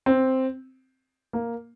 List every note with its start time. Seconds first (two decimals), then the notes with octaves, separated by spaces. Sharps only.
0.06 C4
1.33 A#3